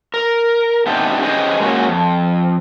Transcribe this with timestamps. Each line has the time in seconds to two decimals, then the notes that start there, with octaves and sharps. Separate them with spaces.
0.14 A#4
0.86 A3 B3 C4 D4 D#4 G4
1.22 C#4 G4 G#4 B4 C5 D#5
1.60 G#3 A#3 C#4 F#4
1.88 F2